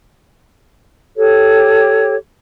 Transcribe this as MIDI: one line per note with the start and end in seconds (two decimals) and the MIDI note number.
1.15 2.13 67
1.15 2.13 69
1.15 2.13 73